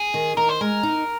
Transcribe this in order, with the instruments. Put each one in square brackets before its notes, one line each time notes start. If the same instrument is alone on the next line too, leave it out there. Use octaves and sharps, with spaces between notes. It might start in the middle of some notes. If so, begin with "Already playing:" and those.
Already playing: [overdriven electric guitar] G#4
[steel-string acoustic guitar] D#3
[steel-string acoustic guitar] D#3 [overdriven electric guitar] A#4
[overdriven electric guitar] C5
[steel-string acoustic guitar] G#3 [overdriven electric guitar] A#4
[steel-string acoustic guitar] D#4